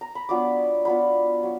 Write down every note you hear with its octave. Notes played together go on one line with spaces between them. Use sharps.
A#5
B5
F#3 B3 D4 F4 D6
F#3 B3 D4 F4 B5
F#3